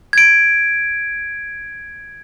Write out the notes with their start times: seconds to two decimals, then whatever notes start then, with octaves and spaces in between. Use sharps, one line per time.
0.13 G#6 D7